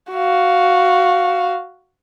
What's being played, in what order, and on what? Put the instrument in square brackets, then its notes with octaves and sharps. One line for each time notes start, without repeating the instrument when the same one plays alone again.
[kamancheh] F#4 F5